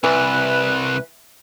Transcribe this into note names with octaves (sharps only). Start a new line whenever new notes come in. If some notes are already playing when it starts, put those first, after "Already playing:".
C2 E3 B4